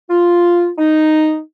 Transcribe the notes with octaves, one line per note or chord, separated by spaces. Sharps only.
F4
D#4